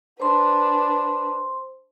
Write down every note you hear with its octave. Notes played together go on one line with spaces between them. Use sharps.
D4 B4 C5 C6